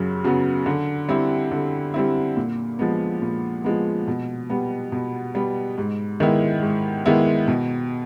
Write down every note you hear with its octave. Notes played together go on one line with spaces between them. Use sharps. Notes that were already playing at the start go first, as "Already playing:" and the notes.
Already playing: F#2 C#3 F#3
C#3 F#3 B3
D3
G3 C4 E4
D3
G3 C4 E4
A#2
F3 G#3 B3
A#2
F3 G#3 B3
B2
G3 B3
B2
G3 B3
G#2
D#3 G#3 B3 E4
G#2
D#3 G#3 B3 E4
B2